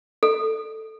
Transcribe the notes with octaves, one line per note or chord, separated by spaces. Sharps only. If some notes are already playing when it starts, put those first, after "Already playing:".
A4